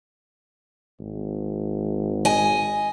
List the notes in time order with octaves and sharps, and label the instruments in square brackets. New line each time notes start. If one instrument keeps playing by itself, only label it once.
[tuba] G#1
[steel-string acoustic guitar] D#5 G#5